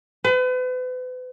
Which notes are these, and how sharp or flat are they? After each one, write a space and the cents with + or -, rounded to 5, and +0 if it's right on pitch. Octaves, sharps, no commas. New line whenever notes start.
B4 +40